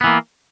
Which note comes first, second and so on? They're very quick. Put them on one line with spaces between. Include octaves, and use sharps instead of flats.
B3 E3 A#3